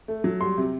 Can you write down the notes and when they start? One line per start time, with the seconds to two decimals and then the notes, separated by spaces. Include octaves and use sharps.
0.08 A3
0.24 F#3
0.41 G3 C6
0.58 C3